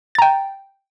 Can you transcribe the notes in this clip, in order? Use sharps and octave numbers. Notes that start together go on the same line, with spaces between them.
G5 A#5 A6